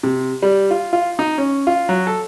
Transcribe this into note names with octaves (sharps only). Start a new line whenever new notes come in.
C3
G3
F4
F4
D#4
C#4
F4
F#3
A4